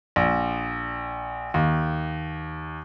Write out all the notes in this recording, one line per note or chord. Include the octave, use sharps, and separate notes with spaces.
A#1
D#2